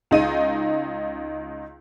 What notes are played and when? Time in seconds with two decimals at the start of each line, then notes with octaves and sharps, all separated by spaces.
0.11 C#2 D#4 D#7